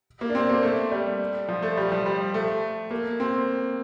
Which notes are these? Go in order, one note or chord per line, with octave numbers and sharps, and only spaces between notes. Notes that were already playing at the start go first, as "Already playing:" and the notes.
A#3
D4
C4
A#3
A3
G3
F3
A3
G3
F3
G3
A3
A#3
C4